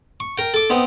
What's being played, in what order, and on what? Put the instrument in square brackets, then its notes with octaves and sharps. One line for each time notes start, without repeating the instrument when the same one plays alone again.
[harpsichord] C#6
A#4 G5
A4 D6
B3 C4 D#4